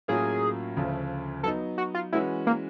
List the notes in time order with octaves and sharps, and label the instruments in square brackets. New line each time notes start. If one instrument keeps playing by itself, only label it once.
[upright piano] A2 F#3 A#3 C#4 F4 [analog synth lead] G#4
[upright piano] D2 C#3 F3 A3
[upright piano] F#3 B3 D#4 [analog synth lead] A4
[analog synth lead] F#4
F4
[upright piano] E3 G#3 C#4 F#4 B4 [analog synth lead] E4
[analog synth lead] A#3